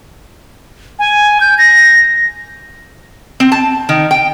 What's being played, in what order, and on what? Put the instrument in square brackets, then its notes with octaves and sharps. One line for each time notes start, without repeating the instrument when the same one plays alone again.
[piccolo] G#5
G6
A#6
[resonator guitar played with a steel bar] C4
A5
D#3
G5